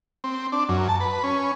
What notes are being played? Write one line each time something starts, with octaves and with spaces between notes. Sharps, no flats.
C4
D4
F#2
A5
B4
C#4